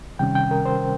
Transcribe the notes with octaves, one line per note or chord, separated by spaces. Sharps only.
C3 D#3 G3 C#4 G5
G5
A#4
C5